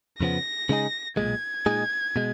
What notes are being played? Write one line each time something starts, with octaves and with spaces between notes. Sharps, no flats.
F2 C#3 F3 B3 A#6
C#3 G#3 D#4 G#4
B1 A#2 G#3 G#6
A#2 G#3 D#4 G#4
B2 G#3